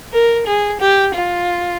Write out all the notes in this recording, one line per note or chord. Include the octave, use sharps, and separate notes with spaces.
A#4
G#4
G4
F4